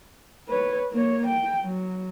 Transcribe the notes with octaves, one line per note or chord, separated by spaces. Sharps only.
B4 C#5
A#3 C#5
G5
F#3